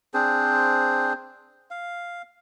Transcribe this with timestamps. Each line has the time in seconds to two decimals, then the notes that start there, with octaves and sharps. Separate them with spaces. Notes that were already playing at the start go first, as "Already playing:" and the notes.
0.14 C4 D4 G#4 C5
1.71 F5